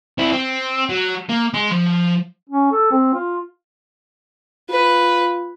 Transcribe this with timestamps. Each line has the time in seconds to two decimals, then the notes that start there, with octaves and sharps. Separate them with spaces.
0.18 C4 E4
0.33 C4
0.89 F#3
1.29 A#3
1.54 G#3 C6
1.71 F3
2.50 C#4
2.72 A4
2.91 C4
3.14 F4
4.70 F4 B4